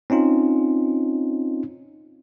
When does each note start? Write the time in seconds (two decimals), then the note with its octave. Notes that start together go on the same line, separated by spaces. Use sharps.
0.10 C4 C#4 D#4 F4